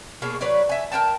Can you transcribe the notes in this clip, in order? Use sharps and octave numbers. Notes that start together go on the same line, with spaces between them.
B2 A#3 G#4 C#5
F#3 B4 C#5 D5
E5 G#5
A#4 C#5 G5 A5